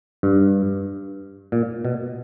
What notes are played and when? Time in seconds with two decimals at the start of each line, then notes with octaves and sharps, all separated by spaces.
0.23 G2
1.52 A#2
1.85 B2